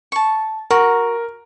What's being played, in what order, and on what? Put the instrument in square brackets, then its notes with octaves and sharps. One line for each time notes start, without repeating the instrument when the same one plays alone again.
[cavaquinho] A5 C#6
[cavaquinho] F#4 [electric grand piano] A#4